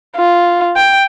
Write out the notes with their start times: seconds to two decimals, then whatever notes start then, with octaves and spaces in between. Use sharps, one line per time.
0.17 F4
0.76 G5